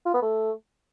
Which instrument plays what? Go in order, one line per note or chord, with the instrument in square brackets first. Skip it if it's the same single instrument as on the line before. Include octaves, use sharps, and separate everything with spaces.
[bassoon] F4
B3
A3